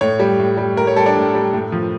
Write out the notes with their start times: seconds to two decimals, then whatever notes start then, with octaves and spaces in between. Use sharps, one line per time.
0.01 A2 C#5
0.20 G3
0.39 A2
0.57 G3
0.76 A2 A#4
0.87 C#5
0.96 G3 A4
1.06 D4
1.16 A2
1.35 G3
1.53 A2
1.72 F3